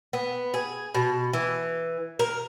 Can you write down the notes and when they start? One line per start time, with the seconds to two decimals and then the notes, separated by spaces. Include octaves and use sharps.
0.13 B3
0.54 G#4
0.94 B2
1.33 E3
2.19 A#4